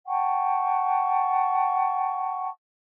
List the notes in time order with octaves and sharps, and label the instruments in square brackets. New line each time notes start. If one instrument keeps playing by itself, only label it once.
[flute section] F#5 G5 A5 C#6